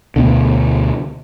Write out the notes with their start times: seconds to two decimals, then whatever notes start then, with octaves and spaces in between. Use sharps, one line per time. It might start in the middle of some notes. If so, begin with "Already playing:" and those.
0.16 D2 B2 D3